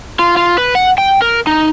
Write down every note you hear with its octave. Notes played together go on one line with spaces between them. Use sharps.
F4
F4
B4
F#5
G5
A#4
D#4